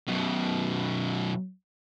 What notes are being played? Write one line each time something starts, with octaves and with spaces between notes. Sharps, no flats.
F#2 B2